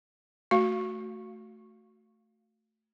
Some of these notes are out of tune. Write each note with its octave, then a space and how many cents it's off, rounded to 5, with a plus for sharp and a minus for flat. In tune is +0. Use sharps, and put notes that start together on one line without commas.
A3 +0 F#4 +0 F5 +0